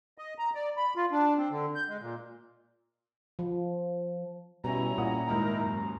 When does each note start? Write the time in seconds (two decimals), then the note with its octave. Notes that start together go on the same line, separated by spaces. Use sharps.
0.18 D#5
0.39 A#5
0.55 D5
0.77 B5
0.96 F4
1.12 D4
1.38 C4
1.50 D3
1.75 G6
1.88 G#3
2.01 A#2
3.39 F3
4.64 B2 G3 C#4 E4 A#5
4.98 A#2 C#5 F#5 D#6
5.27 D#2 G#2 D#4 E4 A#4
5.62 F#2